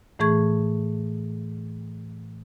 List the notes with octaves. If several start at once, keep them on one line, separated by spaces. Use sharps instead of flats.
A2 E3 A3 G#4 C#6 G#6